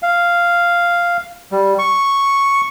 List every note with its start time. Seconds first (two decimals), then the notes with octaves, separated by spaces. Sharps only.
0.03 F5
1.52 G3
1.79 C#6